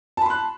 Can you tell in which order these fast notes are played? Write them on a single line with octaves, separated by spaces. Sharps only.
A5 B5 C6 F#6